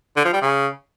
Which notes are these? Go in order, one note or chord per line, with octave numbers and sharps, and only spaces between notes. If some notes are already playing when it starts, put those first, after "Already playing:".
D3
F3
G3
C#3